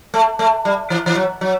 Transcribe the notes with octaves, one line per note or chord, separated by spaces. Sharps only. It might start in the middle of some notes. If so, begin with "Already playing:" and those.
A3
A3
G3
E3
E3
F#3
F#3